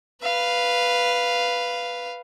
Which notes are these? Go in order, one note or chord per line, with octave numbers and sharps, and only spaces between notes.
B4 F5